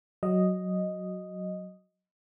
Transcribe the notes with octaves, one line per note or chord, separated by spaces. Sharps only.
F#3 D#5